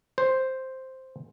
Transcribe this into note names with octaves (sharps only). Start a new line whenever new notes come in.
C5